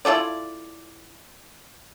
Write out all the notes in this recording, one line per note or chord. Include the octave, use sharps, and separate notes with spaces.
E4 F4 A4 D5